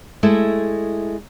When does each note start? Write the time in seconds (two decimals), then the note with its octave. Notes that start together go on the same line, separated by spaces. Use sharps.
0.23 G#3 A3 E4